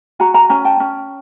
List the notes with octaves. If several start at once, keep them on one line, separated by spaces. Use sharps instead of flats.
F#4 G#5 A#5
G#5 A#5
C#4 G#5 A#5
G5 A5
C#4